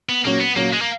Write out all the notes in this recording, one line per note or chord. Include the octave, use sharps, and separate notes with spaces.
B3
A#2 F#3 A#3 C#4
B3
A#2 F#3 A#3 C#4
G#3
A#3